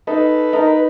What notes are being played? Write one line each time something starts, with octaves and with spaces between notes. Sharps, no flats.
D#4 A4 B4
D#4 A#4
B4